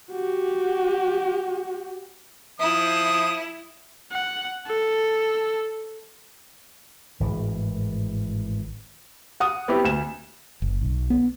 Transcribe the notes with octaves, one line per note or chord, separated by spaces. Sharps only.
F#4 G4
F3 E4 D#6
F#5
A4
G#1 A2 E3
F#5 D#6
B3 C4 E4 G4
D2 E7
F#1
B1
B3